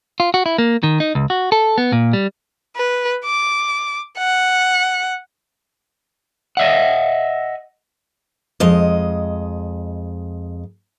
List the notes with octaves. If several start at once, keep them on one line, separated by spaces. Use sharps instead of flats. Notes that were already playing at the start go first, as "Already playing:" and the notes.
F4
F#4
E4
A#3
D#3
D#4
C#2
F#4
A4
B3
A#2
G3
B4
D6
F#5
D#5 E5 F#5
F2 G#3 D#5